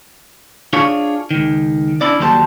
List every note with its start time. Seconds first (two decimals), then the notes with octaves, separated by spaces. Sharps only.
0.73 D4 F4 G#4 C#5
1.31 C#2 D#3
2.01 C#4 D4 E4 D5
2.19 D#2 F#3 G3 A4 C5 A5